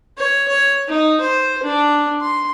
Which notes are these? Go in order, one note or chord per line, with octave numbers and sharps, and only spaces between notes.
C#5
C#5
D#4
C5
D4
C6